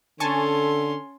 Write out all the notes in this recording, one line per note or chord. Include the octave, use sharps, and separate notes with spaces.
D3 C#4 A4 G#5 A5 C6 C#6